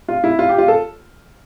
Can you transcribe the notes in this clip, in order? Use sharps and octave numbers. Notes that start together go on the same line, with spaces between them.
F4
E4
F4
G4
F4
A4